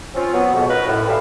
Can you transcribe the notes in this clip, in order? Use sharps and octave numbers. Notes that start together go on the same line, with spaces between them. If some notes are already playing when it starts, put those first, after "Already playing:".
C4 C#4 F4
F#3 B3
F2 G#2 B2
C#4 D#4 F4 F#4 A#4 B4
F#2 A2
G4 A4 B4 D5 E5 F5